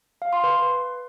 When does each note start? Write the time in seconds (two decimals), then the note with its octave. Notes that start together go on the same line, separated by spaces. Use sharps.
0.22 F5
0.33 C6
0.44 B4